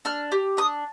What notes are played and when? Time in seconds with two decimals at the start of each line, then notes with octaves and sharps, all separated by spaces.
0.05 D4 F6
0.32 G4
0.57 D4 D#6